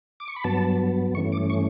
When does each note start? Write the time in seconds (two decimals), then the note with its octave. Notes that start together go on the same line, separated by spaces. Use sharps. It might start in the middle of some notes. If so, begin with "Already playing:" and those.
0.20 D6
0.28 C#6
0.36 B5
0.44 G2 F#3 B3 A5
1.14 G2 E3 A3 C#4 C#6
1.32 D6
1.50 C#6